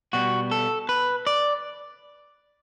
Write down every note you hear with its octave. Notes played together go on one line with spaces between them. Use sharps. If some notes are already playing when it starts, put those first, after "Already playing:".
B2 G3 F#4
A4
B4
D5